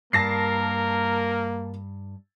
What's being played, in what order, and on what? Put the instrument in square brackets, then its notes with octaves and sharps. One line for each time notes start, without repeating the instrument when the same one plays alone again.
[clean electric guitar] G2 [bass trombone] A#3 [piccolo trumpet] A#4 [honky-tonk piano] A5 A#6 C7